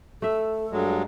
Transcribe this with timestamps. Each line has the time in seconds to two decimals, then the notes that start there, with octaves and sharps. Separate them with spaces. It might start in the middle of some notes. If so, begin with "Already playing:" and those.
0.22 A3 A4 E5
0.71 G2 F#3 G#3